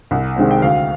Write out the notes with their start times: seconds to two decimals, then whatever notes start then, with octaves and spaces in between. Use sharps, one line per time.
0.11 C2
0.36 C3 D#3 G#3 C4
0.51 G5
0.62 D2 F5